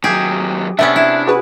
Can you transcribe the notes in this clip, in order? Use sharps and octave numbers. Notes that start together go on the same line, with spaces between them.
D#2 F#3 G4 G#4
C3 B3 C#4 D4 E5
E4
F#4 G#4 B4